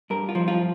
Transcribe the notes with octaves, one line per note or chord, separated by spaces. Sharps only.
G2 A#4
F4
F3
F4